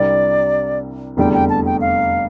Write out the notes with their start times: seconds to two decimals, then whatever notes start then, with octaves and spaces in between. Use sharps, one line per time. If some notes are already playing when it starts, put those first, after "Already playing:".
Already playing: C2 C3 G3 D4 D5
1.17 F1 E2 D3 G3 G5
1.34 G5
1.49 A5
1.65 G5
1.81 F5